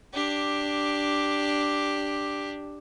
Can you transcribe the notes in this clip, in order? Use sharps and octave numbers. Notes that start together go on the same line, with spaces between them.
D4 G4